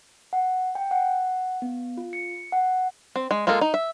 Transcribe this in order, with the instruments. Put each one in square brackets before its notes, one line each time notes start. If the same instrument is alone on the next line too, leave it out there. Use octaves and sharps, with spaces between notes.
[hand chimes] F#5
G5
F#5
B3
F4
C#7
F#5
[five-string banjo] C4
G#3
G#3 A#3 F4 A4 A#4
D#4
E5